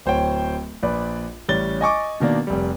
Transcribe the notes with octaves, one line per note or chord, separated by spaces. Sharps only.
D1 C5 C#5 G5
A#1 B4 D5
A1 G3 C#4 A6 G7
D#5 G#5 C#6 D6
B2 D#3 A#3 D4
F1 G3